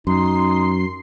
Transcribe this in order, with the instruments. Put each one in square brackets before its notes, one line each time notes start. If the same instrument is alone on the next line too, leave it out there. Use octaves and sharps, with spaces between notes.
[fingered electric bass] F#2 [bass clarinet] D#4 [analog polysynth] C6 C7